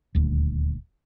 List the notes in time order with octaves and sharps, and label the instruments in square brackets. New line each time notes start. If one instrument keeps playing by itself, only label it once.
[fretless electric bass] D#1 D2